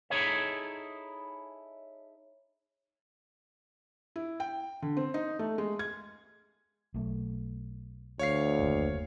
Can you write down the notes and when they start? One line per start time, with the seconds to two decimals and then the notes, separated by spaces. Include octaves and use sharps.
0.10 D#4 E4 G#4 A4 C#5 E5
4.16 E4
4.40 G5
4.82 D3
4.97 C4
5.14 D#4
5.39 A3
5.58 G#3
5.79 G#6
6.94 B1 A3
8.19 D2 C#5 F5 C7
8.59 F#1 D#2